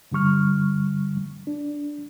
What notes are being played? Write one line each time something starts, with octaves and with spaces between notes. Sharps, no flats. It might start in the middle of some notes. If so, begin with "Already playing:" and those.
G2 D3 G3 C#6 F6
D4